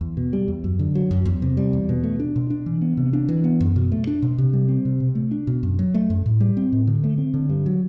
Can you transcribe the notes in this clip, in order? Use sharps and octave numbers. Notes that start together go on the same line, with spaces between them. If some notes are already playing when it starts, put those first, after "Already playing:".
E2
B2
G3
E2
F#2
D3
F#3
F#2
E2
C3
G3
E2
B2
A3
D4
B2
D4
E3
B3
C3
D4
E3
B3
F#2
B2
A3
D4
B2
C3
G3
C4
C3
B2
A3
D4
B2
F#2
F#3
A3
F#2
A2
G3
C4
A2
D3
A3
C4
D3
G2
F#3